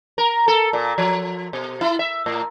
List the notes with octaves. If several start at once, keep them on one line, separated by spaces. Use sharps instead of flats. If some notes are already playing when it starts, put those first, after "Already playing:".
A#4
A4
A#2
F3
B2
E4
E5
A2